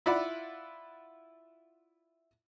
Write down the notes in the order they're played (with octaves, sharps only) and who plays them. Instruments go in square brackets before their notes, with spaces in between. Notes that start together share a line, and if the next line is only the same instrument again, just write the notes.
[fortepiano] E4 F4 D5 E5 F#5 B5